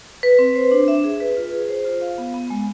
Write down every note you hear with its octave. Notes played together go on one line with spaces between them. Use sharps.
B4
C4
C5
D4
E5
G#4
B4
F4
G#4
C5
F4
F5
B3
B3
G#3